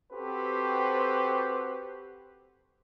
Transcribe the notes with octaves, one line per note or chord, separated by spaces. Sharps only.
C4 F#4 G4 A4 B4 C5